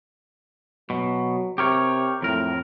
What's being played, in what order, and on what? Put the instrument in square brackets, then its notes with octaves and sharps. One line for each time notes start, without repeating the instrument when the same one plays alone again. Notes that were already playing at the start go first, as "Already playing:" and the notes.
[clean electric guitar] B2 [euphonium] F#3
[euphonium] C3 [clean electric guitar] G4 A#4 C#5
[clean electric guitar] F2 A#4 [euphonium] A2